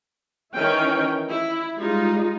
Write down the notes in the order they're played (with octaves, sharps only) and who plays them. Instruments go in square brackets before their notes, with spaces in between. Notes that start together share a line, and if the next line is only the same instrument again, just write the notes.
[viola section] D#3 E3 C#4 E4 C#5 G5
E4
G3 G#3 D#4 F4